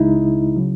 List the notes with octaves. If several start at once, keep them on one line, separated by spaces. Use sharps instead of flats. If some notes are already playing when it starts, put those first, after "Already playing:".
Already playing: C#2 C#3 G#3 D#4 E4
C#3 F#3